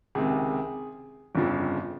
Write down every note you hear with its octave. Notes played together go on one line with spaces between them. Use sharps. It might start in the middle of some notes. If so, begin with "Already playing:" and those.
C#2 C3 D#3 G#4
G1 F2 C#3 F3